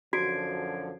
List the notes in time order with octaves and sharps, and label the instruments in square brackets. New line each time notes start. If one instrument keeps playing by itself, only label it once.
[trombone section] F#2 D3 F3 [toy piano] F#4 [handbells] G#6 C7 D7